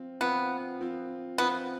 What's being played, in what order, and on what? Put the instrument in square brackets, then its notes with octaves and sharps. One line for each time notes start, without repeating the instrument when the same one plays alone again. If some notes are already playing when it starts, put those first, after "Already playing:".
Already playing: [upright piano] F3 C4 F4
[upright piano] F3 C4 F4 [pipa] B3
[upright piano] F3 C4 F4
[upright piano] F3 C4 F4 [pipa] B3